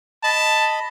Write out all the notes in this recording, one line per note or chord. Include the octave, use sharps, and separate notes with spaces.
D#5 A5 B5